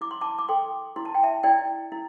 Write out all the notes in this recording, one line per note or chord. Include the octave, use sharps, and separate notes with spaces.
E4 D6
C6
A5 D6
D6
A4 G5 C6
E4 C6
A5
G5
E5 A5
E4 D5 G5
E4